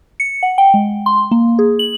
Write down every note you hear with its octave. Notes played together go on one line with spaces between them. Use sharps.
C#7
F#5
G5
G#3
C6
A#3
G#4
F#7